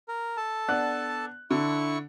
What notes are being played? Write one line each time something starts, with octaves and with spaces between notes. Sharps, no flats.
A#4
A4 A5
B3 D4 F#6
D3 E4 C#6